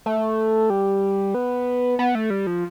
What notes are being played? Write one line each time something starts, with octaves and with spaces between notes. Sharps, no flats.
A3
G3
B3
B3
A3
G3
F3